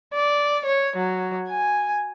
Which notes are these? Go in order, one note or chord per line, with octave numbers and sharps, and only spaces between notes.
D5
C#5
F#3
G#5